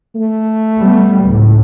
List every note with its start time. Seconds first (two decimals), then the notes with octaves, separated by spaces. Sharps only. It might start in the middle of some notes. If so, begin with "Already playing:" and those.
0.15 A3
0.79 G3 B3
1.26 C#2 A2